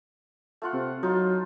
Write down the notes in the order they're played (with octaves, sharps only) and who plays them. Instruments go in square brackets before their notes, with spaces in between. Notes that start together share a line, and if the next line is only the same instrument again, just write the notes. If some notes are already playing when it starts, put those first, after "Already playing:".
[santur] A3 F4 F#5
[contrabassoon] C3
[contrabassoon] F#3 [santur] D#4 F4